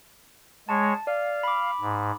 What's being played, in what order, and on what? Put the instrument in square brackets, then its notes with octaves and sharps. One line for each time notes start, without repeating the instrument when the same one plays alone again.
[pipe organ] G#3 C#5 [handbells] A5
[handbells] D5 [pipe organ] F5
[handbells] B5 D6
[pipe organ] G#2